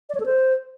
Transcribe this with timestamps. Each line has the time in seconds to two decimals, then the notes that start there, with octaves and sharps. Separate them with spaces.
0.09 D5
0.15 C#5
0.20 A4
0.26 C5